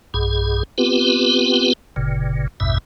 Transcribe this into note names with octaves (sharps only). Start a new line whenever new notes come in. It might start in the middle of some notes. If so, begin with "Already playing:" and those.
B1 G2 G#4
B3 C4 F4 G4 B4
G1 A#2 C#3
A1 E2 G2 B2 E5